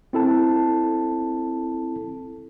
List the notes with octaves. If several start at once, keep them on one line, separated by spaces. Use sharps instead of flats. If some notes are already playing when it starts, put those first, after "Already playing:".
C4 E4 A4 A5